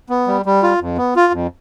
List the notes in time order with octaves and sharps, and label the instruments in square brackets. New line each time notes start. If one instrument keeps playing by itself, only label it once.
[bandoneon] B3
G3
G3
F4
F2
B3
F4
F2